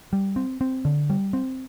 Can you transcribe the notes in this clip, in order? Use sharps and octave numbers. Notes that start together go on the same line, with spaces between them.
G3
C4
C4
D3
G3
C4